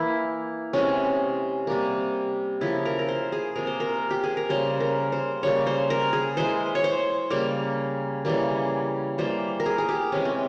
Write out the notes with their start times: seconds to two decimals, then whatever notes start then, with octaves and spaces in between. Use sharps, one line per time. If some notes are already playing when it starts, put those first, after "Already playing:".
Already playing: E3 A#3 E4
0.73 C3 E3 G#3 C#4
1.67 C3 G3 A#3
2.61 C#3 F3 A#3 E4
2.85 A#4
2.99 A#4
3.08 C5
3.32 G#4
3.56 C3 F3 A#3 A#4
3.67 C5
3.80 A#4
4.10 G4
4.24 G#4
4.37 A#4
4.49 C#3 G3 A#3 C5
4.80 A#4
5.12 C5
5.43 C#3 G3 A#3 C#5
5.67 C5
5.90 A#4
6.13 G#4
6.37 E3 G#3 C5
6.75 C#5
6.84 C5
7.30 C#3 G3 A#3
8.25 C#3 E3 G3 A#3
9.18 E3 G3 A#3 C5
9.60 A#4
9.66 G#4
9.78 G#4
9.89 G4
10.12 C3 E3 G#3 C#4
10.25 C4